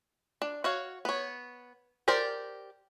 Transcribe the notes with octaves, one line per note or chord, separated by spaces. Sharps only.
D4
F#4 C#5 F5
B3 C#5
G4 A#4 C5 D5